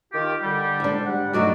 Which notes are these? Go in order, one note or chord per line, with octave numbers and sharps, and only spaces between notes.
D#3 F4 G4
D3 G3
G#2 D4
G3 F#5
G2 F#3 A3 D#4 F#4 D5